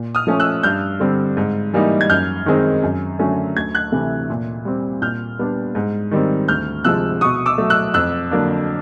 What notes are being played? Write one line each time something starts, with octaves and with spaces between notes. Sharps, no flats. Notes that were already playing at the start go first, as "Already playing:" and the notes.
Already playing: A#2
D#6 F6
F3 A3 C#4
E6 F#6
G2 F6 G6
D3 G3 C4
G#2
E3 G3 A#3 D#4
G#6
F#2 F6 G6
D#3 G#3 C4 D#4
F#2
D3 F#3 A3 C#4
D2 G#6
F#6 G#6
C3 E3 A3
A#2
G3 C4
A#2 F6 G6
G3 B3 D4
G#2
D#3 G3 C4
D2 F6 G6
C3 F3 G#3 E6 F#6
B2 C#6 D#6
D6 E6
F#3 A3
E6 F#6
F2 E6 F#6
D3 F#3 A#3 D4